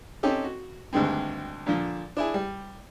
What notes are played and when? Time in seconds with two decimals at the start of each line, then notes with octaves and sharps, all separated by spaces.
0.23 C4 C#4 D#4 G4 A4
0.44 F#4
0.93 D2 G2 D#3 G#3 C4
1.66 A#2 D3 F3
2.17 D4 E4 G#4
2.34 G3